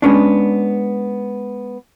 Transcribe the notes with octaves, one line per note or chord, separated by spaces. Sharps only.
G#3 B3 C#4 D4